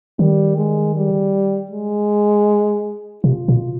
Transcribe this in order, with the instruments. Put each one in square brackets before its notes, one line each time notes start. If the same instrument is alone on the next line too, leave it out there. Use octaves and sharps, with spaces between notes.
[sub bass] D#3 [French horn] G3
[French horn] G#3
G3
G#3
[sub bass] C3 [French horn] F4
[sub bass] B2